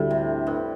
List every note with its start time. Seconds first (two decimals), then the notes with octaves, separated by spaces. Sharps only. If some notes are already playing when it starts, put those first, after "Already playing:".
Already playing: D2 A2 D3 G3 D4 A4
0.11 C3
0.47 G2